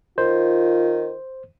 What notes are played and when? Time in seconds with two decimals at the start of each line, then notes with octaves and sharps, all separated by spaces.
0.18 D#3 F4 C5